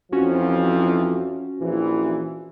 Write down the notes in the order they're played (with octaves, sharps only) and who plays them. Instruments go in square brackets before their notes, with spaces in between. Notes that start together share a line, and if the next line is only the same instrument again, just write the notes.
[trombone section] F2 E3 F3 [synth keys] C#4 F#4
[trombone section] A#1 E3